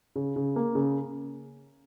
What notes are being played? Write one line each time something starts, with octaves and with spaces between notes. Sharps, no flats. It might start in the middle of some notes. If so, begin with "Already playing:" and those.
C#3
C#3
A#3
C#3